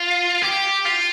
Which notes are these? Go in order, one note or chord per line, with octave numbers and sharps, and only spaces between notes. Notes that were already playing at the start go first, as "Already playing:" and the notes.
Already playing: F4
G4
F4